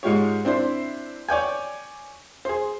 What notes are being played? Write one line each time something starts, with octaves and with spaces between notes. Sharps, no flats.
G#2 G#3 F4 G4 C#5
C4 D4 E4 C5
C#5 D5 G5 G#5
G#4 C5